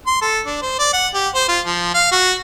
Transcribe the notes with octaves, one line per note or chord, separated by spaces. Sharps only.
C6
A4
D4
C5
D5
F#5
G4
C5
F4
F3
F5
F#4